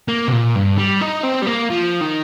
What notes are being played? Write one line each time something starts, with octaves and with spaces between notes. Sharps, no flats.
A#3
C3
A#2
G2
G3
D#4
C4
G3
A#3
F3
D#3